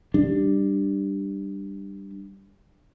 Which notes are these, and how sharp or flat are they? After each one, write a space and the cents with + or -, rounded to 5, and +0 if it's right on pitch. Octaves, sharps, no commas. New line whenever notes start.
G3 +0 D4 +10